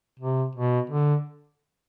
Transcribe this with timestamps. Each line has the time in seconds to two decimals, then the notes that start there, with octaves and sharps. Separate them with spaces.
0.20 C3
0.55 B2
0.90 D3